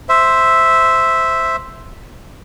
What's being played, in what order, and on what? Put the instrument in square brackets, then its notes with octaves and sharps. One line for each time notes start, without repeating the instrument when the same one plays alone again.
[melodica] C5 E5